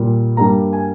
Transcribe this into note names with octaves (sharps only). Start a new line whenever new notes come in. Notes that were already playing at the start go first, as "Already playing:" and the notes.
Already playing: A#2 G3 A#3
G2 G3 A#3 A#5
G#5